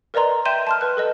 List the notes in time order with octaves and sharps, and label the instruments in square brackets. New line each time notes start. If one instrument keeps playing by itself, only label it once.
[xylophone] A#4 B4 D5 D#5 A#5 C6
E5 G5 C6 G6 D#7 E7
A5 C6 F6
B4 F#6
A4 B4 D#5